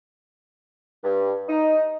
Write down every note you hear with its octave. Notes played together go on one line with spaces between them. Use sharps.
G2
D#4